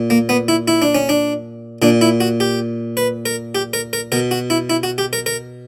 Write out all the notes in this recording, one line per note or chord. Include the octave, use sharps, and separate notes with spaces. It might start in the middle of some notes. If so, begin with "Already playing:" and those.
Already playing: A#2
A#3
B3
E4
E4
D4
C#4
D4
A#2 D4
E4
F#4
G4
B4
A#4
G4
A#4
A#4
B2 A#4
F#4
E4
E4
F#4
G4
A#4
A#4